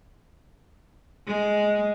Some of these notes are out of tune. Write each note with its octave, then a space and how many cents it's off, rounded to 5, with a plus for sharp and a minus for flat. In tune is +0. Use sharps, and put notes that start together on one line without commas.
G#3 +5